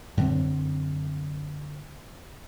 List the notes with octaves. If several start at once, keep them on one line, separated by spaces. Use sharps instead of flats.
F#2 D3 C4